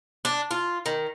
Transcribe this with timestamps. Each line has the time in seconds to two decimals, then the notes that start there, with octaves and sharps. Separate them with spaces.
0.25 D4
0.51 F4
0.86 D#3